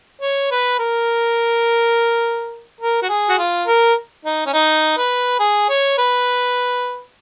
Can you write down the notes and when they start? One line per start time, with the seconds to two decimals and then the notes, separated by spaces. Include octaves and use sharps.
0.21 C#5
0.51 B4
0.79 A#4
2.81 A#4
3.03 F#4
3.09 G#4
3.30 F#4
3.39 F4
3.67 A#4
4.25 D#4
4.46 C#4
4.53 D#4
4.97 B4
5.40 G#4
5.69 C#5
5.98 B4